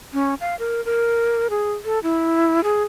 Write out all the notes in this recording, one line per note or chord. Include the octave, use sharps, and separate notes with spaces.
C#4
F5
A#4
A#4
G#4
A4
E4
G#4